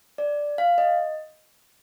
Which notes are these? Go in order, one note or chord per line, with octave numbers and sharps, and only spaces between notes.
D5
F5
D#5